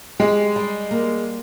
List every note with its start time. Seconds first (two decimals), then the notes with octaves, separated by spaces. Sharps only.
0.20 G#3 G4
0.56 G3
0.91 A#3